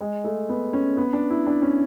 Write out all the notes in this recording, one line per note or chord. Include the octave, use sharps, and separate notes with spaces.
G#3
A3
B3
C#4
B3
D4
E4
D4
C#4